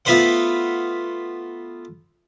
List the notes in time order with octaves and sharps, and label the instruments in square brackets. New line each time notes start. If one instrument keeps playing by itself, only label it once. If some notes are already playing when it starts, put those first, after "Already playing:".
[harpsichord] A3 B3 F4 B4 C5 F#5